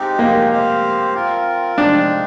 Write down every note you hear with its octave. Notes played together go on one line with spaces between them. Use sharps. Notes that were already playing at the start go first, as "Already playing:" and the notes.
Already playing: G#3 C4 D#4 G4
A#3
C4 G4 C5 F5
C4 F4 A#4
G#3 C4 D4 D#4